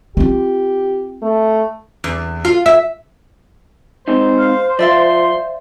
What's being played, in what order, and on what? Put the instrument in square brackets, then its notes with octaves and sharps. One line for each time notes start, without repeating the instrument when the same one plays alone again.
[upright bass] C4 F4 [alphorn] G4
[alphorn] A3
[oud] E2
F4
E5
[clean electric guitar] G#3 C4 D#4 [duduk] C5
[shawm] F5
[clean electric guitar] F3 [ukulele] D5 E5 F5 [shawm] C6